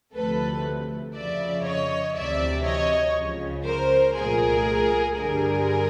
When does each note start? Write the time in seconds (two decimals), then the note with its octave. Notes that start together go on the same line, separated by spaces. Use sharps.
0.13 D2 C3 F3 A3 A4 B4
1.14 F2 C#3 F3 D5 E5
1.65 C#5 D#5
2.15 D2 C3 E3 D5 E5
2.65 C#5 D#5
3.16 C#2 C#3 F3
3.65 A#4 C5
4.15 C2 A#2 F3 A3 G#4 A#4
5.16 G2 D3 G3 G#4 A#4